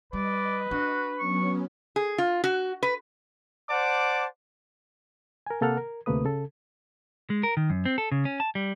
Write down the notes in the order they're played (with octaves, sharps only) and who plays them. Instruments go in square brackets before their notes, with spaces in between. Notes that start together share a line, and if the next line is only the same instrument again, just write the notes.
[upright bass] G3 [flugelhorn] B4 [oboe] D5 [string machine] D#5
[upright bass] D4 [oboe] F#4
[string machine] F#3 B3 C#4 [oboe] C#6
[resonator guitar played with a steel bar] G#4
F4
F#4
B4
[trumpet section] C5 D5 F#5 A5 D6
[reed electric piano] A#4 G#5
C3 A#3 A4 F#5 F6
A#4
D2 C3 A3 A#3 B4 D#6
C#3 A4
[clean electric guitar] G#3
A#4
D#3
F#2
C4
A4
C#3
C#4
A5
G3